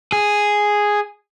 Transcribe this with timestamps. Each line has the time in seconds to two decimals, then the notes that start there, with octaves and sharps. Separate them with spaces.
0.12 G#4